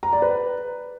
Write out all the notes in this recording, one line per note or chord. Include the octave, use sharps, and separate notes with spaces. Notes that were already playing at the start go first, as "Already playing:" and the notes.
A#5
D5
B4